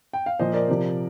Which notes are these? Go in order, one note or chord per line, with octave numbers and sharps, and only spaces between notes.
G5
F5
A#2 F3 C5 D#5
A#4 D5
C3 F3